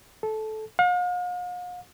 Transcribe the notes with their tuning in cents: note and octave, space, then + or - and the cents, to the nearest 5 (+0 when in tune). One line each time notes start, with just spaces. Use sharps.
A4 -15
F5 +45